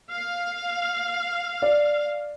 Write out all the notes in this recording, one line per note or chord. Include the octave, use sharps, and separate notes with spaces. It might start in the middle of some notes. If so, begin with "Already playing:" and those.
F5
D5